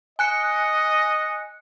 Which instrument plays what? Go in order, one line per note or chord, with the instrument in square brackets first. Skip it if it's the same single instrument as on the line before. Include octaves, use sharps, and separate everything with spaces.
[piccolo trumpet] D#5 [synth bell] G#5 F#6 C#7